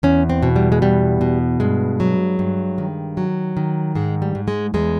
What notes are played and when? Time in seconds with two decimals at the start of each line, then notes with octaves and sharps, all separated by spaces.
0.03 E2 C#4
0.30 C4
0.43 B2
0.56 G3
0.72 G#3
0.82 E2 G3
1.21 B2
1.60 G2 G#3
2.00 F#3
2.39 G2
2.78 D#3
3.17 F#3
3.57 D#3
3.95 G#2 G#3
4.22 G3
4.35 G#2
4.48 G#3
4.74 E2 G#3